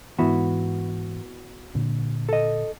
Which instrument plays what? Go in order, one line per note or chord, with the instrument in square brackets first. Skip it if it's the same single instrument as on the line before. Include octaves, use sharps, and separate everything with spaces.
[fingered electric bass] G#2 E3 [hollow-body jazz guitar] B3 E4 F#4
[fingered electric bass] A#2 D3
[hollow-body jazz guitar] A4 D#5